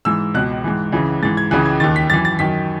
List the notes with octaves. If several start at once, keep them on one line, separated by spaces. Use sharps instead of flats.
G#2 E3 E6
C#2 B2 F#6
G#2 E3
C#2 C#3 E3
G#2 E3 A6
G#6
C#2 C#3 E3 F#6
G#6
D#2 D#3 A6
B6
F#2 E3 A6
A6
F#2 D#3 B6